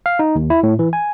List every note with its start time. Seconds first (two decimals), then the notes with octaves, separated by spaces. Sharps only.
0.06 F5
0.19 D#4
0.35 D#2
0.50 E4
0.63 A2
0.79 E3
0.93 G#5